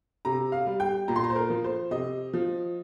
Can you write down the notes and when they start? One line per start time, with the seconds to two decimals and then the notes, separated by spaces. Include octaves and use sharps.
0.25 C3 A#5
0.52 F5
0.66 G3
0.80 G5
1.08 A#2 A#5
1.16 C6
1.24 A#5
1.30 C5
1.35 A#4
1.50 F3
1.64 C5
1.91 C3 D#5
2.33 F3